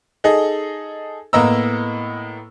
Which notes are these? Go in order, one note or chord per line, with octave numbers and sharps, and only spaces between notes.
D#4 G#4 A4 D#5
A2 A#3 B3 D#5 A#5 E6